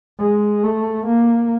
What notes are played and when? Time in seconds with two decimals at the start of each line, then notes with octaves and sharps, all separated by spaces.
0.19 G#3
0.64 A3
1.06 A#3